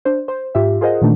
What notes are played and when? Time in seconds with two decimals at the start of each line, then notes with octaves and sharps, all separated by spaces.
0.05 D4 C5
0.28 C5
0.55 G#2 F4 G4 E5
0.81 F4 G#4 A#4 C5 D#5 F#5
1.02 A#2 D#3 E3 A3 D4 D#4